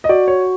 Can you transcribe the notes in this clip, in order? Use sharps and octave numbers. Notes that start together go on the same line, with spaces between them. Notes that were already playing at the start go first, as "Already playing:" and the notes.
D#5
F#4 D5
C#5